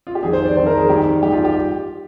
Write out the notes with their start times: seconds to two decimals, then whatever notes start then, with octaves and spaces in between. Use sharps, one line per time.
0.07 F4
0.15 G4
0.23 F2 D#3 G3 G#4
0.33 C5
0.46 D5
0.56 F2 D#3 G3 C5
0.67 A#4
0.77 G#4
0.89 G2 D#3 G3 G4
1.23 G2 D#3 G3 G4
1.33 F4
1.45 G4